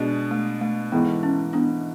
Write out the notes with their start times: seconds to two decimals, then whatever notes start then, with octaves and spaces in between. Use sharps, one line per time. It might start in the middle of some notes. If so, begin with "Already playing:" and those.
Already playing: B2 G#3 D4
0.31 A3
0.61 A3
0.92 G#2 E3 A3 B3 E4
1.23 C#4
1.53 B3 D4